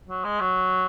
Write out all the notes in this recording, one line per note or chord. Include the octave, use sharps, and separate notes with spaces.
F#3
G#3
F#3